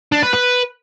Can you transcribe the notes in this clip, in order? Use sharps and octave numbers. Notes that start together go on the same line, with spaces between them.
D4
B4
B4